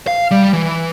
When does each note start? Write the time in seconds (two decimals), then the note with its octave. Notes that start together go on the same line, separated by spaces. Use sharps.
0.07 F5
0.31 G3
0.53 E3